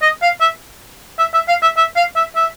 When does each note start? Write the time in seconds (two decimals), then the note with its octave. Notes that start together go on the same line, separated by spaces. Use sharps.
0.02 D#5
0.22 F5
0.41 E5
1.19 E5
1.34 E5
1.49 F5
1.62 E5
1.77 E5
1.96 F5
2.16 E5
2.36 E5